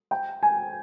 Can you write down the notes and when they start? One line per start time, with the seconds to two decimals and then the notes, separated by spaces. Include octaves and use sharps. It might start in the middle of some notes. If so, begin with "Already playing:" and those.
0.11 G5
0.43 G#5